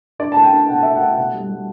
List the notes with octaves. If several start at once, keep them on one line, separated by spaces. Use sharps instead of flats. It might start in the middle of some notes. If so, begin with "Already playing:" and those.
D4 D5
A5
A3
G5
D4
B2 F#5
A3 E5
F#5
A3
B2 F#5
G3
G3